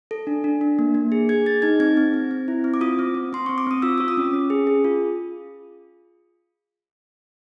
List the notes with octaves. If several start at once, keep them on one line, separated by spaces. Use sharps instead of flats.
A4
D4
D4
D4
A#3
A#3
G#4
G#4 G#6
G#4 A6
D#4 G#6
C4 G#6
C4
C4
C4
E4
C4
D6
F4 D#6
C4
C4
C4 C6
C4 C#6
D6
C4 D#6
F4 E6
F4 D6
D#6
C#4
C#4
G#4
G#4
F4